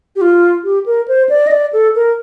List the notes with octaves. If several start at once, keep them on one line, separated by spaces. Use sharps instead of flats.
G4
F4
G4
A#4
C5
D5
D#5
D5
A4
A#4